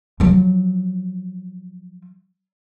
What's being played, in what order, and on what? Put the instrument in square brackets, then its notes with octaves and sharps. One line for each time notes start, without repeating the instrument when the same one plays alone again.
[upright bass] F3 F#3